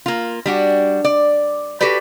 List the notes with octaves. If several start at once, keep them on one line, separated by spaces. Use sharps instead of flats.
A#3 F4
G3 D4 F#4
D5
F#4 G4 A4 B4 D5